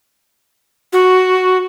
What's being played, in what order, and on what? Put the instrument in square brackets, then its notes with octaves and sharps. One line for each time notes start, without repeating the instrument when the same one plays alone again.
[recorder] F#4